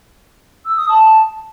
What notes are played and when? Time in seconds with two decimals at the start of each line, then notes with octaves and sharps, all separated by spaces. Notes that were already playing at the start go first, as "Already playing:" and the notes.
0.65 E6
0.77 D#6
0.89 A5